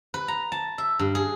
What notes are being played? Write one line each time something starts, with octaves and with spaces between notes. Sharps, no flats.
B4
A#5
A5
E5
G2
G#4